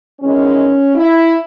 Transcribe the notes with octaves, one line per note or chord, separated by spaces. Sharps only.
E2 D#3 G#3 C#4
E4